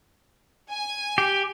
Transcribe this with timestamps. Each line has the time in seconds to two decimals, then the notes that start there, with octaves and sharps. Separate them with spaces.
0.69 G#5
1.18 G4